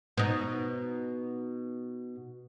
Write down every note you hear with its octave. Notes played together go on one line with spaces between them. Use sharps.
B2 D#4